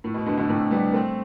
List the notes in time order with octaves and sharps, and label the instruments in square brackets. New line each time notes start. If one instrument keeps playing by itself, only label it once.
[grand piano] A2
B2
B2 D3
B2 D3
A2 C3
G3 B3
A3 C4